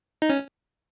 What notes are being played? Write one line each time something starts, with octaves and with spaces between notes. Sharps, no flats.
D#4
C#4